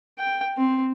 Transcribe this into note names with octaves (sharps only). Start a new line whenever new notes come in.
G5
C4